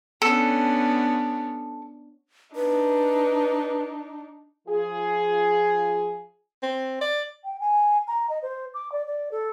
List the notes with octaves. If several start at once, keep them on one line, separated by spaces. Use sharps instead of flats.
B3 C#4 D4 A4
D4 D#4 B4
F3 F4 G#4
C4
D5
G5
G#5
A#5
D#5
C5
D6
D5
D5
A4